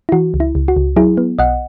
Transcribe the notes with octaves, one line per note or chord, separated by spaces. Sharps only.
E4
E3 F#4
C#2
E4
C#2
F#4
C#2
F#3 E4 G#4
B3
B1 D#5 F#5